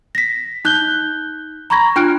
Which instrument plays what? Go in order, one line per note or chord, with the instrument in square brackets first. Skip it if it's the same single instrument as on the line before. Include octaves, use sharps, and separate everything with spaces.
[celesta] A#6 B6
D#4 F#6 G6 G7
A#5 B5 C#6 G#6 A#6
D4 F4 G5 F6 F#6 D7